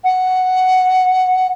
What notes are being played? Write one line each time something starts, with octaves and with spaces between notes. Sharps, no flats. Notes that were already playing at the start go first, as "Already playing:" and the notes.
F#5